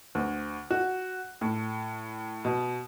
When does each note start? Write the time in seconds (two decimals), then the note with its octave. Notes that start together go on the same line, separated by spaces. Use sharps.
0.15 D2
0.71 F#4
1.41 A2
2.45 B2